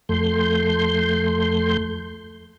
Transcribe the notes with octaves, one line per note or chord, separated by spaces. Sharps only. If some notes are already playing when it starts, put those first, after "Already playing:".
F2 A3 C6 G6